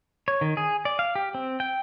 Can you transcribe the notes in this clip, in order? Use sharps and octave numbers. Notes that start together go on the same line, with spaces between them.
C#5
D#3
G#4
D5
F5
G4
C4
G5